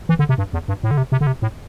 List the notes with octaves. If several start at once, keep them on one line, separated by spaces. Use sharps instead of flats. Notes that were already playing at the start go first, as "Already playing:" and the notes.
E3
D3
C3
G2
E2
G2
A2
D3
C3
C3
D3
C3
A2